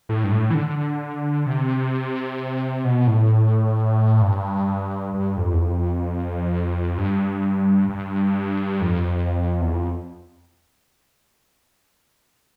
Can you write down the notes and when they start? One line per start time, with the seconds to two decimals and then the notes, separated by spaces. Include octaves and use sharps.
0.09 A2
0.24 G2
0.32 A2
0.50 E3
0.55 D3
1.46 C3
2.84 B2
3.07 A2
4.22 G2
5.14 G2
5.37 F2
5.53 E2
5.60 F2
6.98 G2
7.89 G2
8.81 F2
9.61 E2
9.73 F2